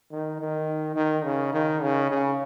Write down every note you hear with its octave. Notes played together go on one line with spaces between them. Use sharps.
D#3
D#3
D#3
C#3
D#3
C#3
C#3